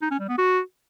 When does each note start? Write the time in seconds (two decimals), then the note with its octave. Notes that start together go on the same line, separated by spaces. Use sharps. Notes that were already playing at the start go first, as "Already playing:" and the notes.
0.02 D#4
0.11 C#4
0.20 G3
0.29 B3
0.38 F#4